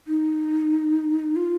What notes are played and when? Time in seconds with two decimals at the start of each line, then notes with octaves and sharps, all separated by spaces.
0.07 D#4
1.36 F4